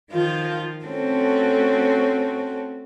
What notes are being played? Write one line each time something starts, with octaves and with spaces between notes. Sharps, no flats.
D#3 F3 F4
A3 C4 C#4 F#4 A4